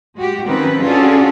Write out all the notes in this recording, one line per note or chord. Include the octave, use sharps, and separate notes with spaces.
G#3 F#4 G4
D#3 F3 C4 C#4 B4
C#4 D4 F4 F#4 G#4 A4